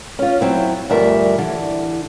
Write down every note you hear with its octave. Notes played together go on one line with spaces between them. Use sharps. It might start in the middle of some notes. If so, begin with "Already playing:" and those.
C#4 F4
F#3 C4 E4
D2 G2 F3 G3 A#4 E5
D3 E3